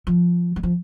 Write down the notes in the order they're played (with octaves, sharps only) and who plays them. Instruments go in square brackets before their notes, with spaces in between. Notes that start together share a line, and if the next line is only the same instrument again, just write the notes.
[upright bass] F3
G3
F3